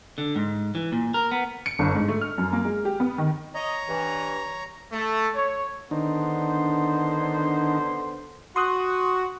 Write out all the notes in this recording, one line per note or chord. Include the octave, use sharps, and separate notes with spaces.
D3
G#2
E3
A#2
A#4
B3
C#7
G1
G#2
A3
F6
F#2
A#3
G#3
G4
B3
D#3
C#5 D#5 A#5
G2 E3
A3
C#5
D3 D#3 B3 D4 D#4 C5
F#4 C6 D#6 F#6